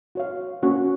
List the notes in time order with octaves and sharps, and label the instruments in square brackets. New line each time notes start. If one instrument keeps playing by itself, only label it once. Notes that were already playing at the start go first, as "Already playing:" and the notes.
[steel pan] F#4 C#5 F5
A#3 C#4 F#4 C#5 F#5